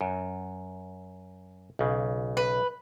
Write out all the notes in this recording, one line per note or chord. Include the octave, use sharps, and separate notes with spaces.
F#2
B1 C#3
B4